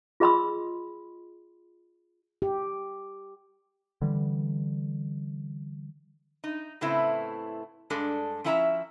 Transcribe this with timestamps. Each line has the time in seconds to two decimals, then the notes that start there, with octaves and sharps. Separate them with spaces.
0.20 F4 G#4 D#5 B5 C6 E6
2.42 G4
4.02 D3 E3 G3
6.44 D#4
6.81 A2 C#3 A3 B3 C4 E4
7.90 G2 G#3 D4 A4
8.44 F3 C#4 E4 E5 G5 A#5